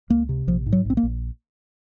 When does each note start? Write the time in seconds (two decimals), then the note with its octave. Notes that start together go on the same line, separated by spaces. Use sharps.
0.10 C#2 A#3
0.29 C3
0.47 A#1 F3
0.66 G#2
0.73 F#3
0.85 A#1 C4
0.97 A#3
1.03 A#1